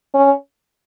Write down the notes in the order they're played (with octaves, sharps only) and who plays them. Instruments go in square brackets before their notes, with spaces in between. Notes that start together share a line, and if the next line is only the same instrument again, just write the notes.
[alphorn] C#4